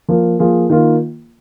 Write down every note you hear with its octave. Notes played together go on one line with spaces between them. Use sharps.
F3 A#3 F4 A#4
F3 A#3 F4 G#4
D#3 A#3 F4